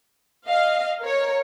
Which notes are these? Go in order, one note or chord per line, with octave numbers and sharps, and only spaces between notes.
D#5 F5
A#4 C#5